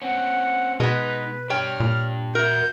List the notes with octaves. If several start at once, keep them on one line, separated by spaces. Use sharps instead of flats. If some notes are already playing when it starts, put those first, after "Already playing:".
C4 C#4 F#5
B2 G#3 B3 D#4 B4
D4 G4 C#5 G5 F6
A#2
F#4 A#4 E5 G6